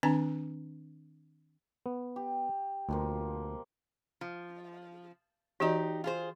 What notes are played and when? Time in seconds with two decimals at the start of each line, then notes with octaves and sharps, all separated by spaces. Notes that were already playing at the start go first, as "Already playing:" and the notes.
0.03 D#3 C4 D4 A5 A#5
1.86 B3
2.16 G4
2.89 D2 B2 F3 A#3
4.21 F3
5.60 E3 D#4 F#4 G4 D5
6.04 F4 G#4 C5